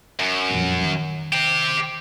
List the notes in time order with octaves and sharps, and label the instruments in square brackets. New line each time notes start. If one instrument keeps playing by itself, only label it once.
[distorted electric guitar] F#2
[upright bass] D#1 F2
D#3
[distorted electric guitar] C4 G4